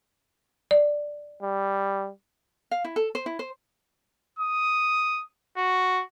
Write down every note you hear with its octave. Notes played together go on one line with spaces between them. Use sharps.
D5
G3
F5
E4
A4
C5
E4
C5
D#6
F#4